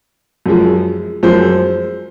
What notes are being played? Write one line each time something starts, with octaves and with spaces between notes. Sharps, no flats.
F#2 F3 G#3
F#2 F3 G#3 C5